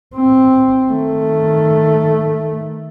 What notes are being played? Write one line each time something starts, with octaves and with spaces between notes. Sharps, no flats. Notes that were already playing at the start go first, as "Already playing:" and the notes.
C4
D#3 A3